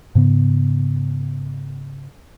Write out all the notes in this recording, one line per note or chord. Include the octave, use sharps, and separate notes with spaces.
G#2 C#3 B3